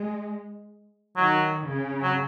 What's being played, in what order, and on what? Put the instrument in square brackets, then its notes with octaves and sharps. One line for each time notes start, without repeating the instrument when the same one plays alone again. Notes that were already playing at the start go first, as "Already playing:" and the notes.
Already playing: [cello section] G#3
[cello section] D#3 [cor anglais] F#3
[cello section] C#3
[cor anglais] F#3